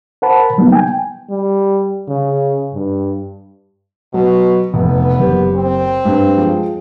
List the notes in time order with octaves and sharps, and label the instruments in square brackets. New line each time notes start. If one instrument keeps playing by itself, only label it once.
[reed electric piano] A#4 C5 F#5 A5 B5
F#3 G3 A#3 B3 D#4
G5 G#5
[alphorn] G3
C#3
G2
[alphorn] B2 [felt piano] F#3
[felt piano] F1 [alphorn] B3
[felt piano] F#1 G4
[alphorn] C4
[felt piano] G2
F3 G#3